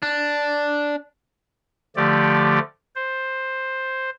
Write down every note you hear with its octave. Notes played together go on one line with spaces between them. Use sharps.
D4
D3 F3 A3 G4 D5
C5